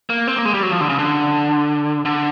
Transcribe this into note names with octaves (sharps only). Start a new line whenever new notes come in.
A#3
C4
A#3
G#3
G3
F#3
F3
D3
C#3
D3
D3